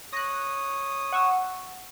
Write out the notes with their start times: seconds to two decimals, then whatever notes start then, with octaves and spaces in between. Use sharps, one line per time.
0.13 C#5 D#6 F#6 A#6
1.12 F#5 C#6 E6